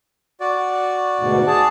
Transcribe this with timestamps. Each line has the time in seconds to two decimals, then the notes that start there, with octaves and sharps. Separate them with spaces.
0.40 F#4 D5
1.20 D2 G#2 B2
1.47 G#4 A5